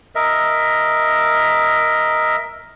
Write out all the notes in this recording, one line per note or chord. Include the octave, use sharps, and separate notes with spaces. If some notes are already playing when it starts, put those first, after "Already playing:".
A#4 D#5 E5